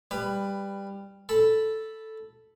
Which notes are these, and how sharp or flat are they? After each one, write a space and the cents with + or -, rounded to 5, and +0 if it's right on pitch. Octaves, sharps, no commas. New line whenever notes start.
G3 +15 B4 +10
A4 +0 B5 +0